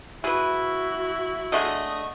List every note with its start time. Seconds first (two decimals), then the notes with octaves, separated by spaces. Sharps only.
0.24 E4 F#4 G#4 B4
1.52 D3 A3 G#4 D#5